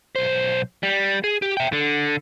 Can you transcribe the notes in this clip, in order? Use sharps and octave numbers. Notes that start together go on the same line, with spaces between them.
B1 C5
G3
G#4
G4
E5 G5
D3